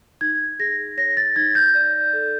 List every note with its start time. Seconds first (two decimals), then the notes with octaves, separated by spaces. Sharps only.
0.21 D#4 G#6
0.59 G#4 A#6
0.97 C#5 A#6
1.17 A6
1.36 D#4 G#6
1.55 G6
1.75 D5
2.13 A4